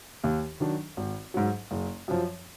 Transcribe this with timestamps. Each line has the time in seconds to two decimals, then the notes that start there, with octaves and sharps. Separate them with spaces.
0.24 D#2
0.60 D#3 F#3 D4
0.97 G#1
1.34 G#2 F#3
1.71 F#1
2.08 F#2 F3